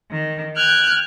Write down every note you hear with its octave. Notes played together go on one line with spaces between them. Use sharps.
D#3
G5 F6 F#6 G#6